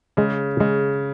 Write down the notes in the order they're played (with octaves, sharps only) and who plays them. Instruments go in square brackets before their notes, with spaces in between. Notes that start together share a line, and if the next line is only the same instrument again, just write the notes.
[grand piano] C#3 [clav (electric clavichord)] G#3
[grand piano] C#3 [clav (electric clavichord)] G#3